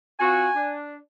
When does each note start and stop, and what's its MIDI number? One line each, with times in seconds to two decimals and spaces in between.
0.20 0.49 60
0.20 0.49 65
0.20 0.49 66
0.20 0.74 80
0.56 0.96 62